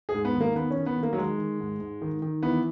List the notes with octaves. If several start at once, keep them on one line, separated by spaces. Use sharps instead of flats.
G#4
G#2
B3
D#3
A#3
D#3 B3
C#4
D#3
B3
D#3
A#3
F#3
D#3 G#3
D#3
G#2
G#2
D#3
D#3
E3 B3